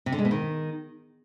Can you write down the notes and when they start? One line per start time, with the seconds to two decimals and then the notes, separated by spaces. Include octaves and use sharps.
0.06 C3
0.12 D3
0.19 G#3
0.25 B2
0.31 D#3